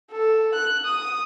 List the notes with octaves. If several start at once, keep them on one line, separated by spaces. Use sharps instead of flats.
A4
F#6
D#6